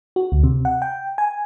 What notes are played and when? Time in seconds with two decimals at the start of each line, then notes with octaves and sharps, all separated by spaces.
0.16 F#4
0.32 D2
0.43 C3
0.65 F#5
0.82 G5
1.18 G#5